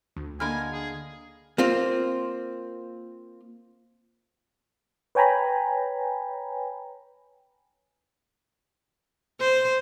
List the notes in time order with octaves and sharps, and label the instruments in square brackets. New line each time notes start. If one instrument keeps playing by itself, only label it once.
[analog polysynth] D2
[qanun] D3 A#3 D#5 [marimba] D4 B5 F6 [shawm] G#5
[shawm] G#4
[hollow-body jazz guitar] A#3 C4 F4
[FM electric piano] B4 C#5 G5 G#5 A#5 B5
[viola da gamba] C5